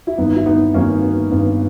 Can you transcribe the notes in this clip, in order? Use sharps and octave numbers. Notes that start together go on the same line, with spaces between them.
E4
G1 G2 D#3 B3 D#4
E4
B3 D#4
G1 G2 D#3 A#3 C#4
B3
G1 G2 D#3 B3